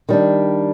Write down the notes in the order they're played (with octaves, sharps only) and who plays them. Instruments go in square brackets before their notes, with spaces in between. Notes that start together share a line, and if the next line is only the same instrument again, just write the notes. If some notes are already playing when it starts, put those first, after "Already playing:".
[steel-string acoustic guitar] D#3 G3 D4